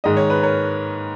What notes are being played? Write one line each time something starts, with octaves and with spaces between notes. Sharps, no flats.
G#2 D#3 G#3 D#5
C#5
B4
A#4 C#5